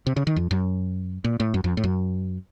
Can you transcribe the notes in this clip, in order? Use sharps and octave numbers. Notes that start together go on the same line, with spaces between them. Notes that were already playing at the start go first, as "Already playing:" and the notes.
C3
C#3
D#3
F2
F#2
A#2
A2
F#2
F2
A2
F#2